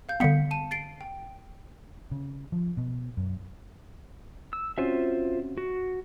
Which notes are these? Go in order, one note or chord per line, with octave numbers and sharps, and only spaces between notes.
F5 G6
D3 G3 B3 F5 B6 C#7
A5 D#7
A6 C7 D7
G5
C#3
F3
B2
F#2
E6
C4 C#4 F4 F#4 C5 E5
F#4